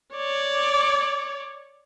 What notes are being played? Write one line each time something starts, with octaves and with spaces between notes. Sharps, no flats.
C#5 D5